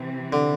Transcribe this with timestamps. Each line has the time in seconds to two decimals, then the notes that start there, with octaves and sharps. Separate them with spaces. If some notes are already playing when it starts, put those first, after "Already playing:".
Already playing: C3 E3 C4
0.32 D3